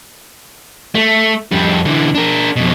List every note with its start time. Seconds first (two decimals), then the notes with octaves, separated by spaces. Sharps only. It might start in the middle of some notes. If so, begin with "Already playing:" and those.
0.95 A3
1.52 F2 G3
1.85 D3 E3
2.15 D4 A#4
2.56 F2 B2